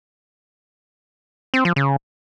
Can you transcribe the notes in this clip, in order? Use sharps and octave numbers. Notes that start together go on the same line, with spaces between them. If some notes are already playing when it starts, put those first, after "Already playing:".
C4
F3
C#3